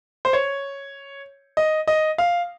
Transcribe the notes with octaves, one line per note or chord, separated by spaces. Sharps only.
C5
C#5
D#5
D#5
F5